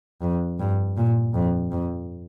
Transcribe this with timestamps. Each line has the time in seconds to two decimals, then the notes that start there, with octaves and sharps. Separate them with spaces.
0.22 F2
0.60 G2
0.97 A#2
1.34 F2
1.72 F2